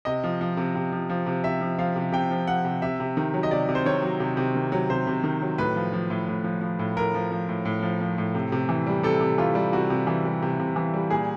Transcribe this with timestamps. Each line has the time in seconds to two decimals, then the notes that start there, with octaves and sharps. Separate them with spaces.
0.05 C3 D#5
0.24 F3
0.41 F3
0.57 C3
0.75 C3
0.92 F3
1.10 F3
1.26 C3
1.44 C3 E5
1.61 F3
1.79 F3 F5
1.96 C3
2.12 C3 G5
2.31 F3
2.47 F3 F#5
2.65 C3
2.82 C3 E5
3.00 C3
3.17 D#3
3.34 F#3
3.43 D#5
3.51 C3 D5
3.69 C3
3.75 C5
3.86 D#3 C#5
4.02 F#3
4.20 C3
4.37 C3
4.55 D#3
4.72 F#3
4.90 C3 C5
5.07 C3
5.24 D#3
5.42 F#3
5.58 A2 B4
5.76 F3
5.93 F3
6.10 A2
6.28 A2
6.44 F3
6.61 F3
6.79 A2
6.97 A2 A#4
7.14 F3
7.32 F3
7.49 A2
7.65 A2
7.83 F3
8.01 F3
8.18 A2
8.35 C3
8.52 C3
8.69 E3
8.87 G3
9.03 C3 A4
9.20 C3
9.38 E3 F4
9.55 G3
9.73 C3 F#4
9.90 C3
10.07 E3
10.25 G3
10.42 C3
10.60 C3
10.76 E3
10.94 G3
11.10 A#2 G#4